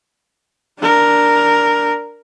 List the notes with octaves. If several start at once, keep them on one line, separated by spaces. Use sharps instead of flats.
D4 A#4